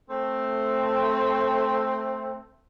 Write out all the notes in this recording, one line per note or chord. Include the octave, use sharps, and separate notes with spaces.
A3 C4